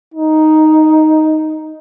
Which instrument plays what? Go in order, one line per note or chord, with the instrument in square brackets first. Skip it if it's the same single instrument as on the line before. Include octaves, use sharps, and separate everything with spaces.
[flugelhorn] D#4